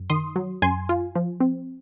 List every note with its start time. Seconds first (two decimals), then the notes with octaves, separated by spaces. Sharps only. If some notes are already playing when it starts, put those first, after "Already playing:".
Already playing: F#2
0.10 D#3 C6 D#6
0.36 F#3
0.62 F#2 G#5 C6
0.89 F4
1.15 F3
1.41 C4